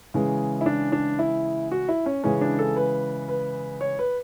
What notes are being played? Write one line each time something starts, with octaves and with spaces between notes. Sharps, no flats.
C#3 E3 G#3
E4
D4
D4
E4
F#4
E4
C#4
C#3 E3 G#3 C#4
D4
A4
B4
B4
C#5
B4